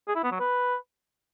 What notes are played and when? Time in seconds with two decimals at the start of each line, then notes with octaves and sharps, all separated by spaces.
0.08 G#4
0.16 E4
0.24 B3
0.32 F#3
0.40 B4